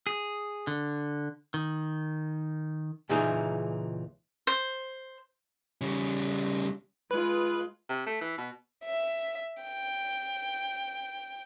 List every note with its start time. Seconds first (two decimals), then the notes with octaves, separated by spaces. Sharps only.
0.07 G#4
0.67 D3
1.54 D#3
3.09 C#2 A#2 E3 D#4 G#4
4.47 C5
5.81 C#3 G3
7.11 G#3 F4 B4
7.89 C3
8.06 A3
8.21 E3
8.38 B2
8.85 E5
9.63 G5